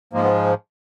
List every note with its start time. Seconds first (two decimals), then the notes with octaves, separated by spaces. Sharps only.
0.13 G#2 F3 G#3 A#3
0.23 B3